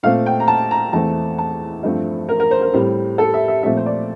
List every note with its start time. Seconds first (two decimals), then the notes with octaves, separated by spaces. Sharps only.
0.03 A#2 A3 C4 F5
0.26 G5
0.40 A#5
0.48 A5
0.71 A#5
0.93 E2 E3 A3 C4 A5
1.38 A5
1.83 G2 F3 A3 C4
2.29 A#4
2.40 A#4
2.51 C5
2.62 A#4
2.74 A2 G3 C4
3.18 A4
3.34 E5
3.48 E5
3.63 A#2 F3 A3 C4 E5
3.77 C5
3.86 D5